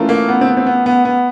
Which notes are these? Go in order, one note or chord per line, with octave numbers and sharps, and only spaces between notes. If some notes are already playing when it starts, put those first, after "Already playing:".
Already playing: E3 A3 C#4 F4 A#4
A#3
B3
C4
B3
C4
B3
B3
B3